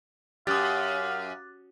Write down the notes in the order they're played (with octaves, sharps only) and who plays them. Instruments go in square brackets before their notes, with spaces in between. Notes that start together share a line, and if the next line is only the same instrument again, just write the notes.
[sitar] F#2 [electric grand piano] G4 D#6 [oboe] F5 [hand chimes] D6 F#6 A6